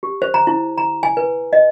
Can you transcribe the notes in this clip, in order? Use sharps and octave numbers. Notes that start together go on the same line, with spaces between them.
G4
C5
A#5
E4
A#5
G#5
B4
D#5